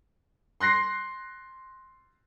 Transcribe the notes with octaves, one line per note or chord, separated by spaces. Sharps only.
C6 F#6 A#6 C7